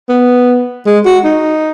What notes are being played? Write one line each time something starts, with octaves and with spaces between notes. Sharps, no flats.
B3
G#3
F#4
D#4